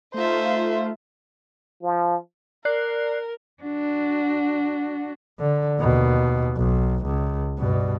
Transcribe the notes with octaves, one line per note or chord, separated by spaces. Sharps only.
A3 D#4 F4 C5 E5
F3
A#4 D5 F#6 C7
D4 F#4
D3
D#2 B2
B1
C#2
G2 B2